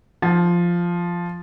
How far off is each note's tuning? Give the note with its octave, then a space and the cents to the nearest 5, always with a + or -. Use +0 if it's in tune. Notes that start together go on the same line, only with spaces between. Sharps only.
F3 -5